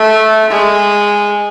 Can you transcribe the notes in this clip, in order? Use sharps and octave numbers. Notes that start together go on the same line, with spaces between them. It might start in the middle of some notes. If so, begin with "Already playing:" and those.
Already playing: A3
G#3